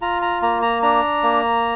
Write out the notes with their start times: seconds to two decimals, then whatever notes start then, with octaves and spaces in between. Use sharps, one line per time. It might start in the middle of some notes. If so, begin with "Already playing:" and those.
0.02 F4 A#5
0.22 A#5
0.42 A#3 A#5
0.62 A#5
0.83 D4 A#5
1.23 A#3